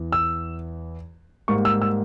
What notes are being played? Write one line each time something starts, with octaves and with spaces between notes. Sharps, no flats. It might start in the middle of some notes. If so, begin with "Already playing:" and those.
Already playing: E2 E3
E6
G#2 G3 A#3 C#6
E6
E6